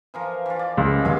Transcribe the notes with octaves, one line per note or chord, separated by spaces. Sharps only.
E3 F3 A#4
E3 F4
D5
C#2
D#1 G#3 E4 F5